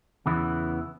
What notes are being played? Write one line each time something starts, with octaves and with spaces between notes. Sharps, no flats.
E2 C#3 E3 B3 E4